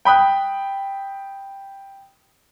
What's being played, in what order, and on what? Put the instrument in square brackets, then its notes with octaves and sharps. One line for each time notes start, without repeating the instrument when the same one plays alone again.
[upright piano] G5 B5 D#6 F#6